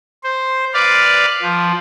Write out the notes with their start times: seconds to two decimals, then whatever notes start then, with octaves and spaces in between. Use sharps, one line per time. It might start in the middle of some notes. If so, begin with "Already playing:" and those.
0.24 C5
0.74 B4 D5 F5
1.42 F3